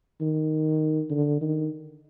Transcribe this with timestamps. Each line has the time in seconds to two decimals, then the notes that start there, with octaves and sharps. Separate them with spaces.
0.21 D#3
1.10 D3
1.41 D#3